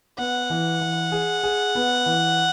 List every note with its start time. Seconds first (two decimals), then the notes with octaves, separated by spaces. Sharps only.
0.18 B3 F#5
0.50 E3
0.81 E3
1.12 G#4
1.43 G#4
1.75 B3
2.06 E3